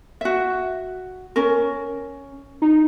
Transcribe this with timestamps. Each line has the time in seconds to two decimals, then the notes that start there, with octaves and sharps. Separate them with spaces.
0.21 F#4 E5
1.36 C#4 A#4
2.62 D#4